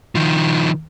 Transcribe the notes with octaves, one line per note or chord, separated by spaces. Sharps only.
D#3 F3